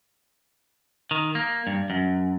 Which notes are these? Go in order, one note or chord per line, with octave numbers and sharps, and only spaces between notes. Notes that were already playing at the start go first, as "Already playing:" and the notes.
D#3
A#3
G2
F#2